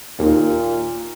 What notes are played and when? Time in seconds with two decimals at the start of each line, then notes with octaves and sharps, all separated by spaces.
0.19 D#2 A#2